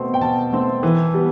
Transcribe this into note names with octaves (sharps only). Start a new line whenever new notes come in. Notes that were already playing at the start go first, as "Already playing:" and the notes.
Already playing: B2 A3 C4
G5
B2 A5
A3 C4
E3
G3 B3